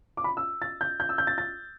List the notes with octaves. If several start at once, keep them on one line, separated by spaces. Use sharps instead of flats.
D6
B5
E6
A6
G6
G6
E6
G6
A6
A6